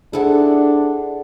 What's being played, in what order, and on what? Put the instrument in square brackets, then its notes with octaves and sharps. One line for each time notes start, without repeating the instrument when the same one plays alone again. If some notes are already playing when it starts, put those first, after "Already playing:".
[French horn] D4 [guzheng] E4 A4 [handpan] G#4 C5 F#5